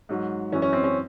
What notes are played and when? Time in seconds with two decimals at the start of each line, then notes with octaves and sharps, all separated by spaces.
0.09 G#2 F#3
0.52 F#2 E3 C#4
0.62 C#4
0.73 C4
0.84 C#4